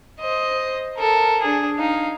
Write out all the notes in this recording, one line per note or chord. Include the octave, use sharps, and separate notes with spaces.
C5 D#5
A4 A#4
D4 G#4
D#4 F5